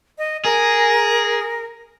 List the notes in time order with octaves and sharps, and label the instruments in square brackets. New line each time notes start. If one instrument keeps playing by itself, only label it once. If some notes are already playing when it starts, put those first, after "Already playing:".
[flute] D#5
[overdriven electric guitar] G#4 [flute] A#4